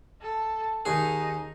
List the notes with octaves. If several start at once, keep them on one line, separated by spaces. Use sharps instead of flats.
A4
D#2 D#4 G#4